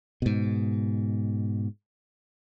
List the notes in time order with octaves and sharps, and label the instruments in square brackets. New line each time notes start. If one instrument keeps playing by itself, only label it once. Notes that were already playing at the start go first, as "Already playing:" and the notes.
[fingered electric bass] G#2 B2